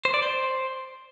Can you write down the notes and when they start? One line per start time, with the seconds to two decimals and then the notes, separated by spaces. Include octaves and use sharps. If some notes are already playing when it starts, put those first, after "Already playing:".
0.05 C5
0.14 D5
0.22 C5